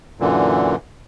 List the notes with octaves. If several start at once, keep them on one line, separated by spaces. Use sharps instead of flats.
F#2 A#2 D3 E3